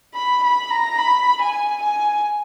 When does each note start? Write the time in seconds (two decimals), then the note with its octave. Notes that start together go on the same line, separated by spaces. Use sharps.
0.14 B5
0.43 B5
0.70 A#5
0.98 B5
1.42 G#5
1.83 G#5